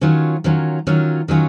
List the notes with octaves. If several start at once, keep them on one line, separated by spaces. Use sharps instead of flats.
D#3 F#3 C#4 F4
D#3 F#3 C#4 F4
D#3 F#3 C#4 F4
D#3 F#3 C#4 F4